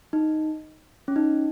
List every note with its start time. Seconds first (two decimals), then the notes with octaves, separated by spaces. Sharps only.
0.13 D#4
1.08 C#4
1.16 D#4